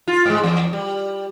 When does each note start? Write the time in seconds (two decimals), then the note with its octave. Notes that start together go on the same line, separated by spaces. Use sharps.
0.07 F4
0.26 G#2 G#3
0.44 E2
0.73 G3